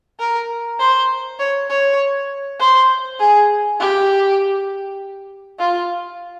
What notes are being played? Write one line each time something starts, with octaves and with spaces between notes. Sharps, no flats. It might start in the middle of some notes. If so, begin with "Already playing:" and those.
A#4
C5
C#5
C#5
C5
G#4
G4
F4